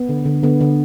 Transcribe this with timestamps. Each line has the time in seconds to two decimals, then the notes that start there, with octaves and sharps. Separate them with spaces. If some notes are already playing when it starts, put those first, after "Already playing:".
Already playing: B3
0.09 D3
0.26 D3
0.43 D3 B3
0.61 D3